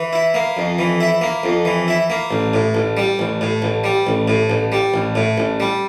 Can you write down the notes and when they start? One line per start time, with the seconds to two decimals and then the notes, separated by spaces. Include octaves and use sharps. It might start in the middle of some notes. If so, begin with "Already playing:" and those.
Already playing: E3
0.13 E4
0.34 A#3
0.57 F2
0.79 E3
1.00 E4
1.21 A#3
1.43 F2
1.65 E3
1.88 E4
2.10 A#3
2.31 A1
2.54 A2
2.75 A1
2.97 G3
3.19 A1
3.41 A2
3.62 A1
3.84 G3
4.07 A1
4.28 A2
4.50 A1
4.72 G3
4.94 A1
5.15 A2
5.38 A1
5.60 G3